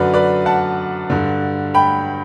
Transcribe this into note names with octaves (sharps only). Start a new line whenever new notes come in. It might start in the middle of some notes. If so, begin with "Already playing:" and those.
Already playing: F#2 D3 B4 D5
B4 D5
F#5 A5
G2 D3
G5 B5